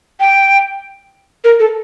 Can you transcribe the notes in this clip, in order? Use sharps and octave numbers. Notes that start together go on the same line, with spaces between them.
G5
A#4
A4